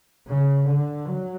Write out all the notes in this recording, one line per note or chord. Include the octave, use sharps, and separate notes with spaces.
C#3
D3
F#3